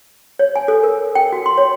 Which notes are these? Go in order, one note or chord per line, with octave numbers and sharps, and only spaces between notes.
C#5
G#5
A4
A#4
G5
F#4
C6
C#5